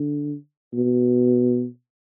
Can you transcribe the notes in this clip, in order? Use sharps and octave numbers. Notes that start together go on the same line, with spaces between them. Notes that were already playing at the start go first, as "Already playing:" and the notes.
Already playing: D3
B2